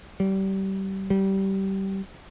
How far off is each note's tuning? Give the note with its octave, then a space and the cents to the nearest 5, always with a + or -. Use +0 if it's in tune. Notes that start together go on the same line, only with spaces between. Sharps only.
G3 -25
G3 -20